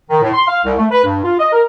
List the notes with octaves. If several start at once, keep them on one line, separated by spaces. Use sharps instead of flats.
D#3
A2
C6
F5
C2
A3
B4
G2
F4
D#5
A#4